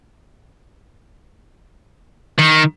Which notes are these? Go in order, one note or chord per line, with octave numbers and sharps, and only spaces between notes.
D#3